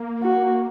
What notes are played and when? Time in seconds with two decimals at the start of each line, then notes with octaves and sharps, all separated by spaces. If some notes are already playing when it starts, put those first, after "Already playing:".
Already playing: A#3
0.22 F#4